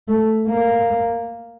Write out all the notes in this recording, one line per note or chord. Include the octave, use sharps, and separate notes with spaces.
A3
A#3